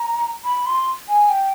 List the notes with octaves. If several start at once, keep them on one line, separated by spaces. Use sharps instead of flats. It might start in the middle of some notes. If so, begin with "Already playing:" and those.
Already playing: A#5
B5
C6
G#5
G5